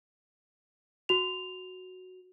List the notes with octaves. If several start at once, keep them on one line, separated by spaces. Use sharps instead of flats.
F#4 F7